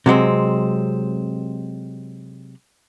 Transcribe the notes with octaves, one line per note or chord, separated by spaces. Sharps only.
C3 F#3 G#3 C4